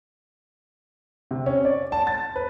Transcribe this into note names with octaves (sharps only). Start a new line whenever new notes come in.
C3
C#4
D5
A5
A6
B4